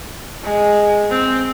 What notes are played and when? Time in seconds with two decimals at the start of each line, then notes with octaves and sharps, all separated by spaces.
0.43 G#3
1.11 C4